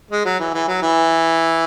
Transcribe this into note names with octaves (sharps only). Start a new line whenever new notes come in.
G#3
F#3
E3
E3
F#3
E3